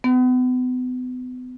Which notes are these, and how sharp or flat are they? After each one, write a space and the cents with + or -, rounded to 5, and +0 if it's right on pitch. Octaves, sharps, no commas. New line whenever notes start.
B3 +35